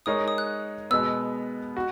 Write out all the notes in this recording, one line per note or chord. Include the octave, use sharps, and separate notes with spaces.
G#3 D#4 A#4 C#5 D#6
D#6
F#6
B2 G#3 B3 E6
F#4